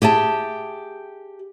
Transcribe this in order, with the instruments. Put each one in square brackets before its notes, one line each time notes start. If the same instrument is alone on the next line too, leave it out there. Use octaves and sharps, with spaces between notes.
[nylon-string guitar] G4 G#4 E5 A5